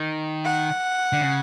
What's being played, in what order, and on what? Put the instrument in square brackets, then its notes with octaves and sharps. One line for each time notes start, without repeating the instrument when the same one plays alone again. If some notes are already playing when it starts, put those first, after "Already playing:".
Already playing: [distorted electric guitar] D#3
[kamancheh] F#5
[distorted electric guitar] D3
C#3